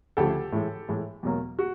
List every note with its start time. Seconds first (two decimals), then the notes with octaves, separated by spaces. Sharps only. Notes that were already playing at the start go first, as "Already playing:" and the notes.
0.17 D2 C#3 F3 A3 G4 A4
0.52 A2 E3 G#3
0.88 A2 E3 G#3
1.23 E2 B2 F#3 A#3
1.59 F#4